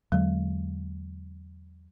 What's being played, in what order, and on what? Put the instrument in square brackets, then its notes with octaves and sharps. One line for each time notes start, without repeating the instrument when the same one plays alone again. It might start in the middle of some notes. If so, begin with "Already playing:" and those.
[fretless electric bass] E2 D3 G#3 [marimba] F#3